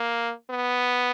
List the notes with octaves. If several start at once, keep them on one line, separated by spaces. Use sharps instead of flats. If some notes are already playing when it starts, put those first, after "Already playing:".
Already playing: A#3
B3